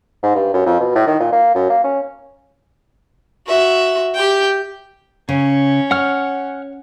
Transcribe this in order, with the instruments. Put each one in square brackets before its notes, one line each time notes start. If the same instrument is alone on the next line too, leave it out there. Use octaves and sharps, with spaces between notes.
[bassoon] G#2
G2
F#2
F2
B2
A2
D#3
A#2
A#3
F#2
A#3
C#4
[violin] F#4 E5
G4 G5
[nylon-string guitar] C#3 [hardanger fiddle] C#4
[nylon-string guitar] C#5 [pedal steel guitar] F#5 F6